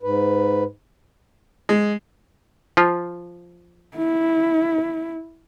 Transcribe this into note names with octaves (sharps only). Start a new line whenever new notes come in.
G#2 B4
G#3
F3 F4
E4